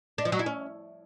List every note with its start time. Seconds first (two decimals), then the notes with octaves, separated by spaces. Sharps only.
0.18 D4
0.25 F3
0.32 F#3
0.39 E4
0.46 C#4